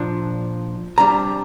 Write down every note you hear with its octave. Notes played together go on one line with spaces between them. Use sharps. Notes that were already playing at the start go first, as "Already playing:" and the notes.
Already playing: A#2 F3 D4
C3 G3 D4 A#5